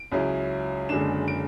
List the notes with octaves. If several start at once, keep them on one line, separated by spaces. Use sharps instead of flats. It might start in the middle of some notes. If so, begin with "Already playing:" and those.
Already playing: D7
C#2 C#3 F#3 C#4 E4
F#1 F#2 D3 G#3 D4 E7
D7